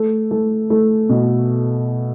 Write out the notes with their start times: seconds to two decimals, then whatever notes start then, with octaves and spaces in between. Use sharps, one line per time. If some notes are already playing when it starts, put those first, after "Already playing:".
Already playing: A3
0.31 A3
0.70 A3
1.09 B2